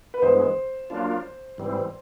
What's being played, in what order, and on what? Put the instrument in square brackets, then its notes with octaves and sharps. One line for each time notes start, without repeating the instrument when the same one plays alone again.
[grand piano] B4
[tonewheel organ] G2 E3 G#3 B3 [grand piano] C5
[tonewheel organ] F#3 A#3 D4 F4
G#2 E3 G3 C4